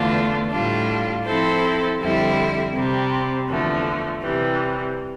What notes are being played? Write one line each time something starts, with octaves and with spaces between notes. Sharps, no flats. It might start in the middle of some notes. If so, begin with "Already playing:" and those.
Already playing: E2 D3 A3 D4 F4
A2 G3 D4 F4
F3 C4 E4 A4 C5
F2 D3 G3 C4 E4
C3 G3 C4
E2 D3 F3 A3
C3 E3 G3